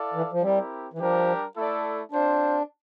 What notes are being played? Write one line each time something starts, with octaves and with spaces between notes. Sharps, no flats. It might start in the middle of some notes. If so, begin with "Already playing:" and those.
Already playing: E4 A4 D5 F5
E3
F3
G3 C4 E4 G4 A#4
E3
F3 G3 D4 G4 A#4
A3 E4 A4 D5
C4 D4 F4 C5